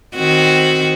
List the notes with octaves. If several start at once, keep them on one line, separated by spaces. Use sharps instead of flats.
D#3 C4 F#4